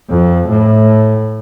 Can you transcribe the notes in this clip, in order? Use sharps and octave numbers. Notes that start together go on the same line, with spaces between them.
F2
A2